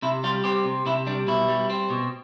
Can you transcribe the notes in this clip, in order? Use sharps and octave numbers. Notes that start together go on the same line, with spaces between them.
C3 E4
G3 F4
C4 G4
C3
C3 E4
G3 D4
B2 E4
G3
C4
B2